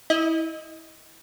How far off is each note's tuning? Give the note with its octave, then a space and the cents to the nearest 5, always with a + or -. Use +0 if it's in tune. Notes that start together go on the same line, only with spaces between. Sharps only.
E4 -30 D#5 +0